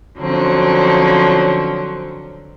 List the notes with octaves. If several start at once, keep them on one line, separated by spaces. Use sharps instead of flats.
D3 F3 F#3 C4 C#4